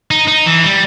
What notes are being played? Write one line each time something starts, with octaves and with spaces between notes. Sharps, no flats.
D#4
D#4
E3
G3